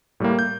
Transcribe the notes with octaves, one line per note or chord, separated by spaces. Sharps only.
A2 G3 A#3
G6